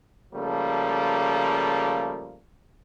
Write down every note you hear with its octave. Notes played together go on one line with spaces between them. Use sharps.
C#3 F3 G3 A3 A#3